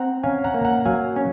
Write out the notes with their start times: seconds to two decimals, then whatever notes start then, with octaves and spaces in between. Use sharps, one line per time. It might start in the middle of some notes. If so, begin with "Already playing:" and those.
Already playing: C4 F#5 A#5
0.23 C#4 F5 G#5
0.44 F#5 A#5
0.54 A#3
0.65 F#5 A#5
0.85 F#3 F5 G#5
1.16 C#4